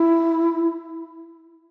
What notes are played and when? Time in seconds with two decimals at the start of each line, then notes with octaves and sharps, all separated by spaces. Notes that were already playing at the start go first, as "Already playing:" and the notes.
Already playing: E4